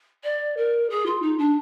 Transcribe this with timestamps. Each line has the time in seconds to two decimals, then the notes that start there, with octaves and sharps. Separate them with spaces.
0.23 D5
0.56 A#4
0.89 G#4
1.05 F4
1.21 D#4
1.38 D4